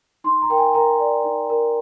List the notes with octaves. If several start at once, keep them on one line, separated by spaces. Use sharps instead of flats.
D#4 C6
A#5
A#4 G5
G#5
A#4 A#5
D5
D#4
A#4